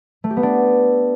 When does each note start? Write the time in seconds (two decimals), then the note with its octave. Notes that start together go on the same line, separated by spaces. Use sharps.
0.24 A3
0.30 G4
0.37 B3
0.43 D4